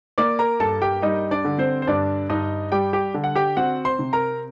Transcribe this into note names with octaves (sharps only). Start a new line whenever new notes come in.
A#3 D5 D6
A#4 A#5
G2 A4 A5
G4 G5
G3 D#4 D#5
D4 D5
D3
C4 C5
C5
G2 D4 D5
G2 D#4 D#5
G3 G4 G5
G4 G5
D3
F#5
G4 G5
C4 F#4 F#5
C5 C6
C3
A#4 A#5